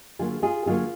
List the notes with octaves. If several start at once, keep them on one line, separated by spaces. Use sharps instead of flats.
D3 F#3 A#3 F4 G#4
F4 G#4
D3 F#3 A#3 F4 G#4